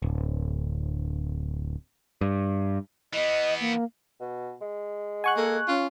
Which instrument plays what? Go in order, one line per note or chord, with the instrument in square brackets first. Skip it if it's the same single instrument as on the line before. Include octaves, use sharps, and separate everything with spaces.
[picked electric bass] D1
G2
[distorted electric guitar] E3 B3 [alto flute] D#5
[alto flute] A#3
[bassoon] B2
G#3
[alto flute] F#5 [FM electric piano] G#5 C#6 F#6
[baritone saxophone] A#3 [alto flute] A4
[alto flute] C#4 [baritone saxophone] F4